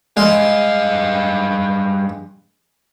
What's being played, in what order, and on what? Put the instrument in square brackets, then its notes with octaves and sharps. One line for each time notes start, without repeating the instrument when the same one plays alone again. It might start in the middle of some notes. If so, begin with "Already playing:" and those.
[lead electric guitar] G2 F5 [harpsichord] G#3